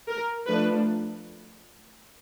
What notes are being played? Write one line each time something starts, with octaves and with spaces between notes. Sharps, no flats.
A#4
F3 A3 D4 B4